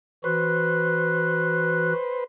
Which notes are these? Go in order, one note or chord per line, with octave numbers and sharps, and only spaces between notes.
E3 F#4 B4 C5 F#6